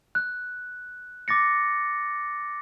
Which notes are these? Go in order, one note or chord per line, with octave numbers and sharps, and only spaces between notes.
F#6
D6 A6 A#6 C#7